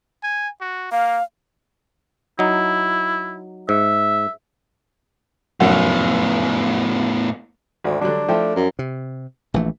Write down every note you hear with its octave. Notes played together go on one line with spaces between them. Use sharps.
G#5
F#4
A#3 F5
F#3 D#4 E4
G#2 E5
F1 F#2 A2 B3 F#5
G#1 D2
D3 F#3 G3 D4
F3 A3 E4 G5
F#2
C3
A#1 E3 A3